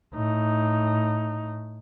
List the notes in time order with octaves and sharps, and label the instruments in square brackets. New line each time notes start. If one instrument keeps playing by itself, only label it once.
[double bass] A2 D#4